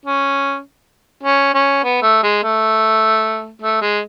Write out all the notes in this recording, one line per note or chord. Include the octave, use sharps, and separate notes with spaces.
C#4
C#4
C#4
B3
A3
G#3
A3
A3
G#3